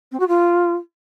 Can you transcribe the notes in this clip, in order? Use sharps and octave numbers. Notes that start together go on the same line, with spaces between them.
C4
F#4
F4